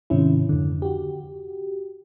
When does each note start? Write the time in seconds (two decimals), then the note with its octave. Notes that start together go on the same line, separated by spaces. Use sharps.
0.10 G#2 C3 D#3 C#4 E4
0.49 F2 D3
0.82 F#4 G4